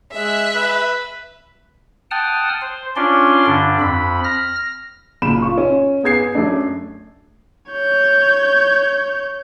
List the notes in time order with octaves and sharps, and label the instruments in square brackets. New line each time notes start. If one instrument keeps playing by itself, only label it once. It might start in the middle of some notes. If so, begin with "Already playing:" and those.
[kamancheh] G#3 F#6 [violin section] E5
[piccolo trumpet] B4
[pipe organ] F#5 G5 A5 D#6 F6
C5
C#4 D4 F4 D5 C6
G2 D3 D4
F2 B5
F6 A#6
[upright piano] F#1 A#2 B5 E7
F4 C#6
C#4
B3 G#4 G#6 C7
F#2 A3 D4
[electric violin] C#5 G6